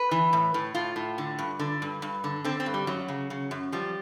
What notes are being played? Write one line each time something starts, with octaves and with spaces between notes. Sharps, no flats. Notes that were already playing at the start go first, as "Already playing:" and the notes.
Already playing: B4
E3
A2
A2
A2 F4
A2
D3
G2
D3
G2
G2
D3
D3 C4
C4
G2
G3
F#2 F#3
C#3
C#3
F#2
F3 G3